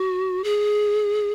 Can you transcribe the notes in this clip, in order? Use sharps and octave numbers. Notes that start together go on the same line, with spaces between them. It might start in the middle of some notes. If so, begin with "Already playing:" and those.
Already playing: F#4
G#4